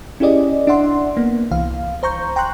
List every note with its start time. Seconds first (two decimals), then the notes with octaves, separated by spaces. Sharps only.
0.20 C#4 E4 G4 G#4 D5 D#5
0.67 D4 D5 E5 F#5 C6
1.17 A#3 B3
1.51 C2 E3 F5
2.03 C5 A#5 C#6 G6
2.36 G5 A#5 C6 C#6 F#6